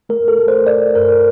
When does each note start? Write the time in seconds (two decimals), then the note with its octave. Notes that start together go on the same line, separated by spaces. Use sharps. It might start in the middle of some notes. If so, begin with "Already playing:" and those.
0.09 A3 A#4
0.28 A4
0.38 A3
0.48 C5
0.66 A3 D5
0.95 G2 A#4